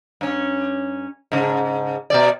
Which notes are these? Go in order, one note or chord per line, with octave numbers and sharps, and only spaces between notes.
G2 C#4
G#2 C#3
B2 G3 D5